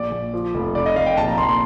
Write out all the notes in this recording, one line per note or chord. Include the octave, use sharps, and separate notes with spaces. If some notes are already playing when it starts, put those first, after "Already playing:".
Already playing: A#1 D5
A#1
F3
F1
F1 D5
D#5
F1 F5
G5
A#1 A5
A#5
A#1 C6
C6